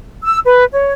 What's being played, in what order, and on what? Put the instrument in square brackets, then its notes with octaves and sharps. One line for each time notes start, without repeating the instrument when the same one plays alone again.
[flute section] E6
B4
C#5